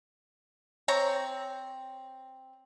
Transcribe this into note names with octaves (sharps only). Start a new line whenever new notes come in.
C4 C#5 A#5